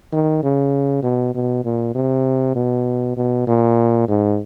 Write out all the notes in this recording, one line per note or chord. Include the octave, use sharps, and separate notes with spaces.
D#3
C#3
B2
B2
A#2
C3
B2
B2
A#2
G#2